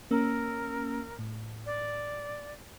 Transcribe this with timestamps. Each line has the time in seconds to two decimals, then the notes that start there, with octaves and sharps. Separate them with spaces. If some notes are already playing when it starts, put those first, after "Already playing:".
0.11 A#3 C#4 A#4 E6
1.19 A2
1.66 D5